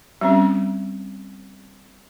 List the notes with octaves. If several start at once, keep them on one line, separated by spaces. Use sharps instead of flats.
G3 C4 C#4